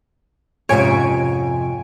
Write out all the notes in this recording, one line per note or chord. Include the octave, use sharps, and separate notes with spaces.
F2 G#2 C3 C#4 C#5 G#5 D7